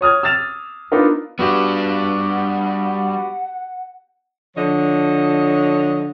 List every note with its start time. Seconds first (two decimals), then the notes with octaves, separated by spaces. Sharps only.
0.01 C#5 D#6 F6 G#6
0.23 E6 F6 A6 E7 F7
0.92 B3 D4 D#4 F4 A#4
1.39 G3 B3 D4 F#4 G4 F5
2.31 F#5
4.55 D3 F3 C#5 D#5